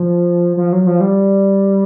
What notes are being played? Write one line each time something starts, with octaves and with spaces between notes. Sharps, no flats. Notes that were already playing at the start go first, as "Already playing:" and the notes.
Already playing: F3
F3
F#3
F3
G3